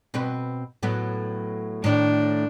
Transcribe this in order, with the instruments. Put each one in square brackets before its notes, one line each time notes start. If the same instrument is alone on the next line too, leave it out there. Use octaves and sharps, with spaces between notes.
[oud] B2 C4 B4
A2 F#3 B3
[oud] A2 D#3 C#5 [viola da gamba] D4